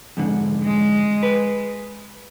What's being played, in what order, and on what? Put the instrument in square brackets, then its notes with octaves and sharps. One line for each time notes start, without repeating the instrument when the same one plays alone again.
[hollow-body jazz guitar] F2 G#2 D3
[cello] G#3
[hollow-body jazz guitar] B4